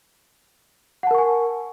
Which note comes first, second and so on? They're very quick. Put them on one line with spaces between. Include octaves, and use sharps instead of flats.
F#5 A5 A#4 C#6 G#5